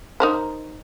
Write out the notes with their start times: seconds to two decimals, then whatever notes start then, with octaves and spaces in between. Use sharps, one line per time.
0.20 D#4 A#4 C5